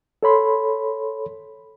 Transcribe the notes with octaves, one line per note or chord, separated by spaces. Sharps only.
A4 C#5 B5 C6